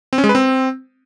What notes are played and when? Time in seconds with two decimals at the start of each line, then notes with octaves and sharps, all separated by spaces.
0.13 C4
0.18 C#4
0.24 G#3
0.29 B4
0.35 C4